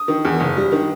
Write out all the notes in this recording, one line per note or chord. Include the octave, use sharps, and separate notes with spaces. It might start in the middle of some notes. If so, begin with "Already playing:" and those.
Already playing: D#6
D#3
E2
F#1
G3
D#3